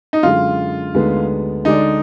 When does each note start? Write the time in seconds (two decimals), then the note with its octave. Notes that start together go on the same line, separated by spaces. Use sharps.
0.13 D#4
0.23 F#2 D3 G#3 F4
0.94 D2 D3 G#3 B3 D#4
1.65 D3 G#3 D4 D#4 G#4 D5